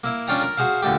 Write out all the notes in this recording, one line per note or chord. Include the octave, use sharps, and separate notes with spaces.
A#3 E4
C#4 D4 F4 C#5 G5 A#5
A#4
F#4 G#4 C5 F5
A#2 D3 A3 G4